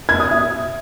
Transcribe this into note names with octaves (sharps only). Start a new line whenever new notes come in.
G#6
D#6
E5